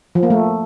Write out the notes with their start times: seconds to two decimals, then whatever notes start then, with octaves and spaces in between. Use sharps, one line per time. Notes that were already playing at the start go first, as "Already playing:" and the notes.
0.15 F3
0.23 A#3
0.30 A3